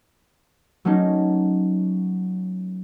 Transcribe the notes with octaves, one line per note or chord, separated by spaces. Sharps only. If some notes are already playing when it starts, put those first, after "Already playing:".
F#3 A3 A#3 C#4 D#4